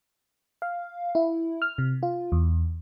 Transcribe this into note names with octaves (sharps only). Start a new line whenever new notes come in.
F5
E4
F6
C3
F4
E2